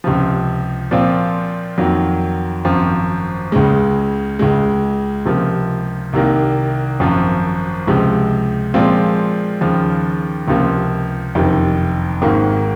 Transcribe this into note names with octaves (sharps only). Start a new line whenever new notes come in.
C#2 C3 F3
A#2 F3 C4 F4
F2 D#3 F#3 A#3
G#1 F#2 F3
C#2 C#3 G#3
C#2 C#3 G#3
C#2 C3 F3 A#3
C2 C3 D#3 A#3
G#1 F#2 F3
C#2 C3 F3 G#3
A#2 F3 G#3 C4 F4
D#2 C#3 F3
C#2 C3 F3 A#3
F#1 F2 C3 D#3
G#1 G#2 D#3 A#3